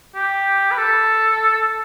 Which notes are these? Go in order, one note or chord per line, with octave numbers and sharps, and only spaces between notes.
G4
B4
A4